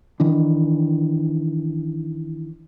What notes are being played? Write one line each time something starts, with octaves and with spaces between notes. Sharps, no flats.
D#3 E3 D4